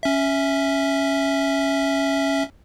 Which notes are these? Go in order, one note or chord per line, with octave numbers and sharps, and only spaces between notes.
C#4 E5